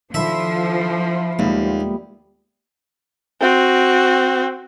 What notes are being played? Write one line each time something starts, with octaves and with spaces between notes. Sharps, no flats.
D3 D#3 F3 E4 A4 E5
D#2 A#2 G3 G#3 B3
C4 F#4